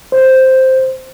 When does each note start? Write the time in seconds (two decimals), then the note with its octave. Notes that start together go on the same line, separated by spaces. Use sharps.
0.12 C5